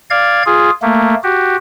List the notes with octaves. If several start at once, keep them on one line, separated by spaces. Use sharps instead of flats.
D5 F5 G#6
F4 G#4
A3 A#3
F#4 G4